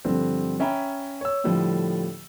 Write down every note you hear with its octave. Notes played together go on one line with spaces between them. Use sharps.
G2 D3 F3 C4
C#4 E5 G5 A#5 B5
C#5 E6
A2 D3 F3 G3 A3